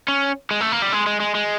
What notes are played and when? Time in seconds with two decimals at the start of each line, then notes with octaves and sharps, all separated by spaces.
0.08 C#4
0.51 G#3
0.61 A3
0.72 A#3
0.82 G3
0.93 G#3
1.07 G#3
1.20 G#3
1.35 G#3